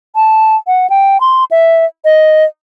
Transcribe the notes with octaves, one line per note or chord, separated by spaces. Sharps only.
A5
F#5
G5
C6
E5
D#5